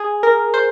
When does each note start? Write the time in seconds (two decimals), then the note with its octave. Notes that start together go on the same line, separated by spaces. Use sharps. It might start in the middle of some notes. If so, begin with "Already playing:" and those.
Already playing: G#4
0.23 A#4
0.54 C5